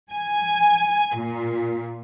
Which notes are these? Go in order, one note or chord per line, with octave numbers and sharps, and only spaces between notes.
G#5
A#2